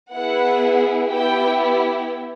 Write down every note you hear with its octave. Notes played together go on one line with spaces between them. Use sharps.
B3 E4 G#4 F#5
B3 E4 G4 G5